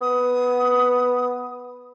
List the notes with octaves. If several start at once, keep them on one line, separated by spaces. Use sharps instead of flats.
B3 D#6